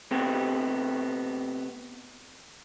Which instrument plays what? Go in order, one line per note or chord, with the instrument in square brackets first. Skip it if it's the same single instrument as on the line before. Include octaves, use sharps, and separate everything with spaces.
[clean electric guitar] C3 A3 B3 C4